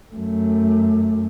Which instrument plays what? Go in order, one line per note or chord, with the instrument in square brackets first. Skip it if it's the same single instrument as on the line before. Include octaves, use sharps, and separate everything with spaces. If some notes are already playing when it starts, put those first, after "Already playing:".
[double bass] F#2 A3